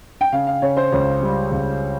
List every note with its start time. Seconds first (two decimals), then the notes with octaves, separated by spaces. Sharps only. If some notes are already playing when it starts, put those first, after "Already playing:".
0.21 G5
0.32 C#3 F5
0.47 F5
0.62 C#3 C#5
0.77 C5
0.92 C#2 C#5
1.22 G3
1.51 C#2